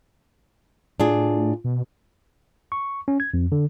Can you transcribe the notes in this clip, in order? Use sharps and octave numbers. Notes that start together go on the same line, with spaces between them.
A2 D4 F4 G#4
B2
C#6
C#4
G#6
F2
D3